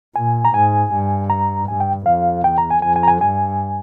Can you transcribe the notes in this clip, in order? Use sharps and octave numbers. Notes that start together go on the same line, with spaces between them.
A#2 G#5
A#5
G#2 G#5
G2
A#5
G2 G#5
G5
F2 F5
E2 G5
A#5
G#5
F2 G#5
G#5
A#5
G#5
G2 G#5